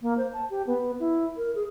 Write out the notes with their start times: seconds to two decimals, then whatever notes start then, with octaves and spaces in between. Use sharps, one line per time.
0.02 A#3
0.17 C5
0.33 A5
0.50 G4
0.67 B3
0.99 E4
1.37 A#4
1.55 G#4